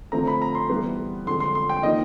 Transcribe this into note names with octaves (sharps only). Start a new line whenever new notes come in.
D3 F3 A3 C4 A#5
B5
A#5
C6
E3 G3 B3
F2 D3 F3 G#3 C6
C6
C6
G5
F3 A#3 D#4 D#5